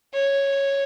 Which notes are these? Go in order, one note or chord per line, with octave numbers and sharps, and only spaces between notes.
C#5